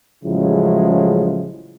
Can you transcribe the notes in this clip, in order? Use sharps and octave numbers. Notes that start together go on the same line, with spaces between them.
A1 C#3 F3 F#3 G#3 E4